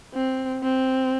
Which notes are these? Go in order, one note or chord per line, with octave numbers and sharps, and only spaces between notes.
C4
C4